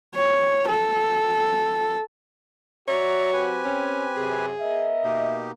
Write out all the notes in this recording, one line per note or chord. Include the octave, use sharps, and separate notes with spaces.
C#5
A4
F#3 F#4 C#5 D5 E5 A#5
C4 G4 B4 G#5
C#4
F#2 C3 G#4
B3 A#4 D#5 E5
B2 A#3 D#4 G4